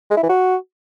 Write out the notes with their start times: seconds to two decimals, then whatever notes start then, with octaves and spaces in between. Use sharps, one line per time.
0.10 G#3
0.17 E4
0.23 E3
0.29 F#4